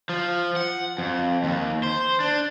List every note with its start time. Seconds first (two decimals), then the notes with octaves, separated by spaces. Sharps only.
0.09 F3
0.56 F#5
0.98 F2
1.44 D#2
1.83 C5
2.20 D4